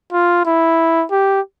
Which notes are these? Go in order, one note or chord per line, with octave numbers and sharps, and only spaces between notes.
F4
E4
G4